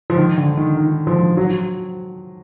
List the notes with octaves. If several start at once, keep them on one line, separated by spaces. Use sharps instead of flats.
F3
D#3
D3
D#3
D#3
F3
F#3